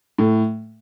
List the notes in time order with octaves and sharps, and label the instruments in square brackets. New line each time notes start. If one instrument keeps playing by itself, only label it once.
[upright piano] A2